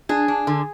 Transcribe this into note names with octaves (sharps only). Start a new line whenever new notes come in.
D4 G#4
D4
D3